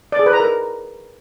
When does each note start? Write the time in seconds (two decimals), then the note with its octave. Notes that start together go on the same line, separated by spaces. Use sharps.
0.12 D5
0.19 G#4
0.26 B4
0.33 A#5
0.40 A#4